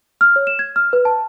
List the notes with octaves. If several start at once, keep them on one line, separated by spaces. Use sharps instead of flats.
F6
C#5
E7
G#6
F6
B4
A5